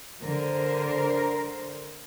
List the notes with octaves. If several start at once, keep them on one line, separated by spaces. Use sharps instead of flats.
D3 A#4 C5